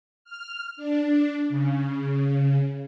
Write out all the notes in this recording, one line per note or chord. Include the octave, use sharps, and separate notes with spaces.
F6
D4
C#3